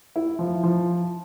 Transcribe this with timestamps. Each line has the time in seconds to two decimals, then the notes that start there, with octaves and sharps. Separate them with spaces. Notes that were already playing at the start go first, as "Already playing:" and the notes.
0.16 E4
0.39 F3
0.63 F3